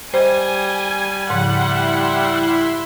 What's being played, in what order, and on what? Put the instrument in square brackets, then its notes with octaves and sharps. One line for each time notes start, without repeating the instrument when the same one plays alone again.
[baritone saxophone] G3 [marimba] C5 D#5 [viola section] G#5
[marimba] G#2 C#3 F3 [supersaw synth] E4 E5 C6 [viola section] F#5